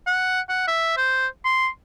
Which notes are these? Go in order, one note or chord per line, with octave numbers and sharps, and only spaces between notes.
F#5
F#5
E5
C5
C6